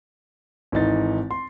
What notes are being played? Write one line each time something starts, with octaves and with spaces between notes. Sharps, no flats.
G#1 E3 D#4 A6
C6